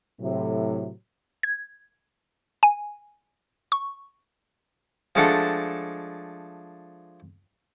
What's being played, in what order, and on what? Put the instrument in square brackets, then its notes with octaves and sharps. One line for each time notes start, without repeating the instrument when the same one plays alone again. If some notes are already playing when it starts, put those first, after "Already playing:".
[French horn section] A2 C3 F#3
[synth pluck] G#6
G#5
C#6
[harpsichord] F3 G#3 A3 D4 A4 F#5